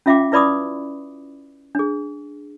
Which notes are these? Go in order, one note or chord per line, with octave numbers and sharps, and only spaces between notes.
C#4 F4 E5 F5 G5 D6
E4 B4 D5 B5 D6 D#6
D4 G#4